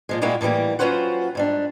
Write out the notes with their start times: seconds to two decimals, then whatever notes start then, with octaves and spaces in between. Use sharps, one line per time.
0.09 A#2 F3 G#3
0.22 A#2 G3 G#3 A#3 E4 F#4
0.41 A2 E3 F3 G3 A#3
0.79 F#3 C#4 F4 B4 C5 F#5
1.35 G#2 G3 D4